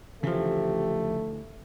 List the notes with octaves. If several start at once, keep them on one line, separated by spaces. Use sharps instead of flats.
D2 C#3 E3 F3 A3 G4